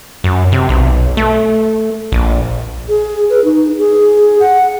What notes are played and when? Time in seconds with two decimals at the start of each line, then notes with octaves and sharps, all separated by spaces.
0.24 F#2
0.52 C3
0.69 B1
1.17 A3
2.12 A#1
2.89 G#4
3.30 B4
3.44 D#4
3.78 G#4
4.40 F#5